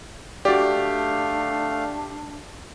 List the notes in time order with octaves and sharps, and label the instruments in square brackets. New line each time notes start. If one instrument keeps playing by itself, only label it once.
[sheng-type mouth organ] A3 F5 [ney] D4 [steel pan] F#4 D5 [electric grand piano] G4